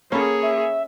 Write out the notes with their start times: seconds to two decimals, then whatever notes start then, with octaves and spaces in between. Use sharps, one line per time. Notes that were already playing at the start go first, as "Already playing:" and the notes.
0.12 A#3 C#4 G#4 A4 C#5 B5
0.42 E5